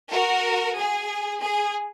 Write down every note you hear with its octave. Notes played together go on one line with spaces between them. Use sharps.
F#4 A#4
G#4
G#4